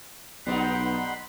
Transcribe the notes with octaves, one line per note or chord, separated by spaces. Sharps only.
B1 G3 B3 D#4 F#5 B5 C6